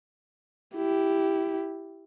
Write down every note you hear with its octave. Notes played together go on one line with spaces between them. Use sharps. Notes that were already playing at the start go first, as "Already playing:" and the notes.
E4 G4